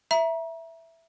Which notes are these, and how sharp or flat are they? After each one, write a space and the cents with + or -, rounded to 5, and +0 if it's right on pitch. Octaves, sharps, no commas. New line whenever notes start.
E5 +0 A#5 +30